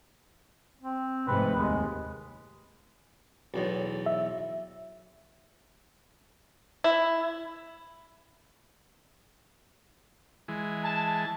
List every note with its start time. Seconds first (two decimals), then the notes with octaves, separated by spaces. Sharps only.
0.81 C4
1.28 F1 G#2 C3 B4
1.56 D#2 G#3
3.54 B1 E2 A2
4.06 E5
6.84 E4
10.48 E3 G#3
10.84 A5